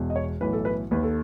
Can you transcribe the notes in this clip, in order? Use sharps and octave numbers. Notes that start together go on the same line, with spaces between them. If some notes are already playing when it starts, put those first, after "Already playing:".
Already playing: E1 E2 B2
D#5
C#5
B1 A2 E3 B4
A4
B4
D#2 D#3 B4
A4